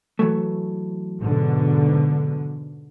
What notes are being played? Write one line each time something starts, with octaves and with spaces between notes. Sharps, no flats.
E3 F#3 A3
G#2 B2 D3